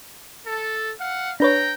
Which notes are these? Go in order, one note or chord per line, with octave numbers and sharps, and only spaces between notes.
A4
F5 F#5
D4 B4 C#5 G5 A#5